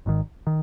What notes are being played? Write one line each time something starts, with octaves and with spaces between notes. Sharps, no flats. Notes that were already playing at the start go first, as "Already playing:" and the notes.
G#1 G#2 D#3
D#3